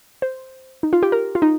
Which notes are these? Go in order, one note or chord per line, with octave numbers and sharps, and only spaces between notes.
C5
D#4
F4
G4
A#4
F4
D#4